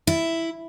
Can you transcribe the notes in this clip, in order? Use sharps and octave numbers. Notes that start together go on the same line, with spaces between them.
E4